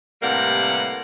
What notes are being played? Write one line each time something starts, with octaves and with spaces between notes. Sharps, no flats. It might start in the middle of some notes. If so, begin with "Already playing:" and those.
A2 C3 G3 A#3 B4 F#5